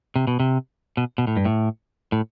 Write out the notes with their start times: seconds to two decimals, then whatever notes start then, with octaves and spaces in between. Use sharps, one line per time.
0.16 C3
0.27 B2
0.40 C3
0.97 B2
1.18 B2
1.27 A2
1.37 G2
1.45 A2
2.12 A2